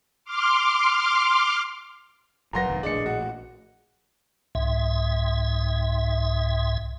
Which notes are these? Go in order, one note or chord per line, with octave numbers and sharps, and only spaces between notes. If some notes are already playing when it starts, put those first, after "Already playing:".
C6 D6 F6
F#1 A#2 F#3 B4 F#5 A#5 C6 A#6
F1 D#3
A#1 A2 D4 G#4 D#5 C#7
F#4
C2 G#2 E5